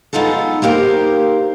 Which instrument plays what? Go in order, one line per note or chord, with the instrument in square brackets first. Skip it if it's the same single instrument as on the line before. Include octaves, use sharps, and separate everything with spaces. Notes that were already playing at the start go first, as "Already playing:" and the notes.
[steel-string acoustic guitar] G#3 B3 D#4 F4 A4
A#3 D#4 G4 A#4 C5